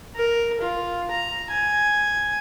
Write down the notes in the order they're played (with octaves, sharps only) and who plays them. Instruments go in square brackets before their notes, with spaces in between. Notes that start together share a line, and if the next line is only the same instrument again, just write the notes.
[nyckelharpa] A#4
F4
A#5
G#5